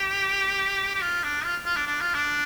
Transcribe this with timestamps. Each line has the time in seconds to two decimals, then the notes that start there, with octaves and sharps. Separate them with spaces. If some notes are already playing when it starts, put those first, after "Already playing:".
Already playing: G4
0.95 G4
1.02 F4
1.24 D4
1.45 F4
1.65 F4
1.76 D4
1.87 D4
2.01 F4
2.14 D4